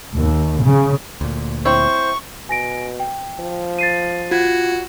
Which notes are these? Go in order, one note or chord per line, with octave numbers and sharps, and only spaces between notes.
D#2
C#3
D2 A#2
C4 E4 C5 C#5 C#6
B2 G#5 A#6 D7
G5
F3
A6 C7 D#7
F4 F#4 G#6